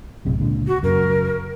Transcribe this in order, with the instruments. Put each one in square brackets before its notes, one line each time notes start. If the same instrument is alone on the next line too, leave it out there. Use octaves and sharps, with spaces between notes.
[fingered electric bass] A#1 F#2 C3
C#2 A#2 D3
[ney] F#4
[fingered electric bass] F#2 C#3 [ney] A#4